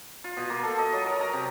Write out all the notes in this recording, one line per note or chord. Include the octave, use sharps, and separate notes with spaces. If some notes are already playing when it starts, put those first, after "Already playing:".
F4
B2
A#3
A4
D#5
F#3
A#4
A#5
C3